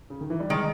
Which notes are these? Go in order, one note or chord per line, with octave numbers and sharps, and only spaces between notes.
C#3
D#3
E3
G3
D#3 G#3